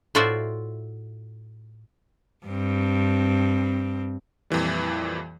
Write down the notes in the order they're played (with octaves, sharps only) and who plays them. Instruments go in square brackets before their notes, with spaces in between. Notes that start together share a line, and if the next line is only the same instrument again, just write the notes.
[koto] A2 F4 F#4 C5 D5 E5
[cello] G2 C4
[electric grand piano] F2 A#2 E3 G3